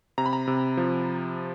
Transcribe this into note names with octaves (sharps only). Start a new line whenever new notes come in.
C3 A#5
B5
A#5
C3
F3